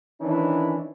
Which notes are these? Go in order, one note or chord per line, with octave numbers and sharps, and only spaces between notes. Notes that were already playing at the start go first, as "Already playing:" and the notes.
D#3 E3 C#4 D4 E4